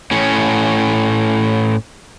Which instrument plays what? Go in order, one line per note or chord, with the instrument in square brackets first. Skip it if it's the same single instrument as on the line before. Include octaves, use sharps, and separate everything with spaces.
[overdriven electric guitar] A2 C#4